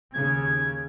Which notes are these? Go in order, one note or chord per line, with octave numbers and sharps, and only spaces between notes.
D#2 C#3 G#6